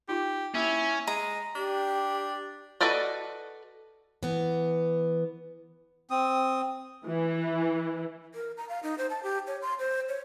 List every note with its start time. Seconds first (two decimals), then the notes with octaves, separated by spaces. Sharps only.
0.09 D#4 F4 G4 C#6
0.55 A#3 C#4 E4
1.07 G#3 A#5
1.56 D4 G4
2.81 F#4 A4 B4 D5 D#5
4.23 E3 B3
6.10 C4 D#6
7.06 E3
8.35 A#4
8.57 A#5
8.69 F5
8.83 D#4
8.98 C5
9.10 A5
9.23 G4
9.47 C#5
9.62 C6
9.79 C5
10.09 C#5